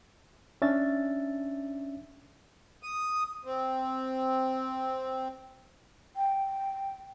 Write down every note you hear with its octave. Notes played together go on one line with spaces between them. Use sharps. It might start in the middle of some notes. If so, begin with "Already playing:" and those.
C#4 D4 E5 A6
D#6
C4
G5